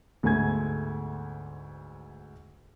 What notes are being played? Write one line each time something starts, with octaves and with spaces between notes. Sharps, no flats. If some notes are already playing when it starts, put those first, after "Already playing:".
D2 G#2 A3 B3 G#5 G#6